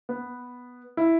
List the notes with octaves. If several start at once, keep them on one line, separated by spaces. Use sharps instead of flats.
B3
E4